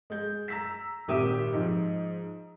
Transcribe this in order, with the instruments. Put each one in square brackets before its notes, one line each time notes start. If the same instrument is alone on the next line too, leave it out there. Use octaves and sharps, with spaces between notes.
[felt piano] G#3 G6
A#5 E6 B6
G#1 A#2 G4 E5 D#6 D#7
G#2 F3